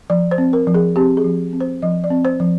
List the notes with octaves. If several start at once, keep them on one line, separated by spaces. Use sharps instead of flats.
F3 D5
C5
C4
A#4
F3
G#4
C4 G4
G#4
F3
C4
C5
F3 D#5
D5
C4
C5
F3